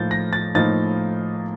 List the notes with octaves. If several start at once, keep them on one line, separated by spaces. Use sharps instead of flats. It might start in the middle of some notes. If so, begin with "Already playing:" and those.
Already playing: A2 F3 A#3 D#4 G6 A6
A#6
A6
A2 F3 A#3 D#4 A6